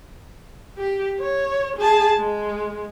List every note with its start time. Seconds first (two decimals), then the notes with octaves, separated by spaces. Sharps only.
0.78 G4
1.19 C#5
1.77 G#4 A5
2.18 G#3